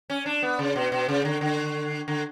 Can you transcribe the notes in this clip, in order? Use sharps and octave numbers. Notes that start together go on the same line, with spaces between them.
C#4
D4
B3
C#3
B2
B2
C#3
D3
D3
D3